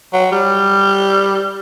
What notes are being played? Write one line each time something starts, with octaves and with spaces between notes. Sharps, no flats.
F#3
G3